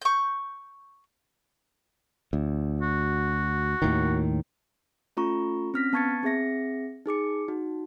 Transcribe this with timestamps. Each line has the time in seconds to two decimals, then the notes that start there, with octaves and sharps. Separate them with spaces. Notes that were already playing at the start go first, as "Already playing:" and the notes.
0.02 C#6 G6
2.33 D2
2.81 F#4
3.82 D#2 A2 D#3
5.17 A3 C#4 F4 A4 A#5 C#6
5.74 C4 C#4 F6 A#6 B6
5.93 B3 A5 C#6 G#6 A6 C#7
6.23 C4 G#4 E5 A#6 C#7
7.06 D#4 G#4 D6 C#7
7.48 D#4 F#4